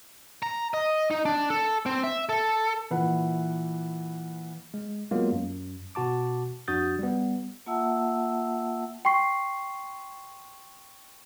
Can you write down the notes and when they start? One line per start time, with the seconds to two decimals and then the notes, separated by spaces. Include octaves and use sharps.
0.43 A#5
0.74 D#5
1.11 D#4
1.25 D4
1.50 A4
1.86 C4
2.04 E5
2.29 A4
2.90 A#2 E3 B4 F#5
4.74 G#3
5.11 F#3 G#3 A#3 B3 F4
5.32 F#2
5.95 B2 F#4 A5 D6
6.68 F2 D4 F#4 D#6 G6 A6
6.99 G3 B3
7.66 A#3 F4 E5 F#5 A5 E6
9.05 G5 C6 C#6 C7